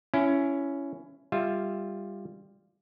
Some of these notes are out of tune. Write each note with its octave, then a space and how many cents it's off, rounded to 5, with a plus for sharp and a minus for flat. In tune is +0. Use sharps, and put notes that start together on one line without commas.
C#4 +10 E4 +20
G3 +15 F4 +0 E5 +0